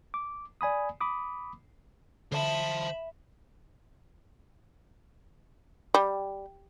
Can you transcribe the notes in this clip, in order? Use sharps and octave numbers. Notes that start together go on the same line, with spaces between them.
D6
D5 G#5 B5 D#6
B5 D6 D#6
D3 C5 E5 A5 B5
G3